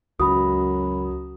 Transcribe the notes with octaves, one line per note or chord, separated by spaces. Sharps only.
C#2 F#2 F#3 B5 D#6